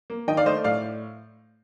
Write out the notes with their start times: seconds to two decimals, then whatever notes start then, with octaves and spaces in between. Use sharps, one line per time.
0.10 A#3
0.28 D#3 D#5 G5
0.37 D5 F5
0.46 A3 C5 D#5
0.64 A2 D5 F5